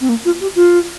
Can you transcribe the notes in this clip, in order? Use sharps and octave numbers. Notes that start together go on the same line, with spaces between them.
C4
A#3
F4
G4
F4